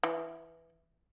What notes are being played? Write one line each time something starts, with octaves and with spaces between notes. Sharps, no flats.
E3